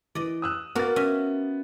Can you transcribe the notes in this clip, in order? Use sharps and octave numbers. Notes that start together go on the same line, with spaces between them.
E3 D5 D#5
D#6 E6 F#6
A#3 B3 F#4 A#4 A6
C#4 D#5 E5